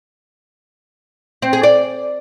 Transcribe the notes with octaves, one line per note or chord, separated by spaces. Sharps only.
C4
G#4
D5